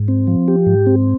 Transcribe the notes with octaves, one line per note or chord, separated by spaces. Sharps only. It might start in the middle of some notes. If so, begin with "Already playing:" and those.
Already playing: G#2
C4
F3
G4
G#2
C4